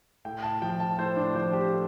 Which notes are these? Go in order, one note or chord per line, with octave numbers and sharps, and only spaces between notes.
A2 G5
A5
F3 G5
A5
A2 C5
D4
F3 C5
G4
A2